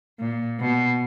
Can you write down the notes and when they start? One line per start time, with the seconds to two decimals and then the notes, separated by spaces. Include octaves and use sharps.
0.19 A#2
0.60 B2